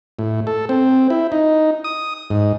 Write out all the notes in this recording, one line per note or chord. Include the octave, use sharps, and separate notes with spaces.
A2
A4
C4
E4
D#4
D#6
G#2